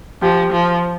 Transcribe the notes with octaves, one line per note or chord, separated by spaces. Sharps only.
F3 G4
F3